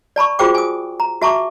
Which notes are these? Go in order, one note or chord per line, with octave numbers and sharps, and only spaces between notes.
D5 A5 B5 C#6
F4 F#4 G#4 C5 G5 D6
G#5 D#6
A#5
F#4 E5 A5 A#5 C#6 D6